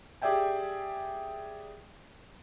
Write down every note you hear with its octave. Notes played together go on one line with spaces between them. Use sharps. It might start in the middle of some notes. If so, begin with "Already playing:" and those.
G4 G#4 D5 E5 G5 G#5